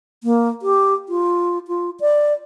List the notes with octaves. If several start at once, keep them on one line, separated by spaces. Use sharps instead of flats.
A#3
G4
F4
F4
D5